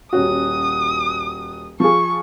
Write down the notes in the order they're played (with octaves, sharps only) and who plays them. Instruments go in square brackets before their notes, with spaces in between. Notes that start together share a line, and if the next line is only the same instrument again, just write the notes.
[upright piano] D#1 C#4 F#4 [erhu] D#6
[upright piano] F3 F4 G#4 [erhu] C#6